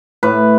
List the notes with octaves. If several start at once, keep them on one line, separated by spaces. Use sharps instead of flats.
A2 B4